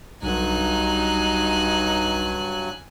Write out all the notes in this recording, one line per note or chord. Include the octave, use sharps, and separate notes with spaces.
B1 G2 D3 F#3 D#4 G#5 F#6